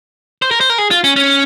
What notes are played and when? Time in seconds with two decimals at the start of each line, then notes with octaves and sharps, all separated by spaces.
0.42 C5
0.51 A#4
0.61 C5
0.70 A#4
0.78 G#4
0.91 F4
1.04 C#4
1.16 C#4